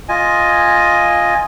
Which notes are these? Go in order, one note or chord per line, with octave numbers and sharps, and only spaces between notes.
F4 D#5 G#5